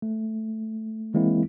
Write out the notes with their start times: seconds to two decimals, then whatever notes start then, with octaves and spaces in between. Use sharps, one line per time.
0.02 A3
1.14 E3 G#3 A#3 C4 E4